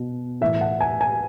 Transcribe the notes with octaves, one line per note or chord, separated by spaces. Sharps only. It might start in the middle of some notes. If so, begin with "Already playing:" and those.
Already playing: B2
A2 E3 E5
F#5
G#5
G#5